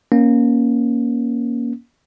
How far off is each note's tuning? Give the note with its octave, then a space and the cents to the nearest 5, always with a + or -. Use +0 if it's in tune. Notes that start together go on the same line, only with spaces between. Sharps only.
A#3 +20 C#4 +0